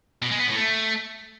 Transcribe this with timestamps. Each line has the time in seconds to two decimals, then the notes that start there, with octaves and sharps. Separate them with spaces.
0.22 B2
0.31 G#3
0.39 B3
0.48 A2
0.57 A3